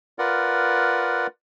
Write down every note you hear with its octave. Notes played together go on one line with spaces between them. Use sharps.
F4 A#4 B4 D5 F#5